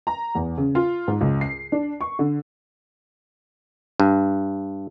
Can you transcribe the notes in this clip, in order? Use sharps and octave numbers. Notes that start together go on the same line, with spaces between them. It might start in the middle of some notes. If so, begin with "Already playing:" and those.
A#5
E2
C#3
F4
G#2
C#2
C7
D4
C#6
D3
G2